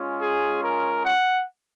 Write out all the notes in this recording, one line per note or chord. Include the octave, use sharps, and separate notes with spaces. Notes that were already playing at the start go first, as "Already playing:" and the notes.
Already playing: G#3 C#4 F4
G#4
A#4
F#5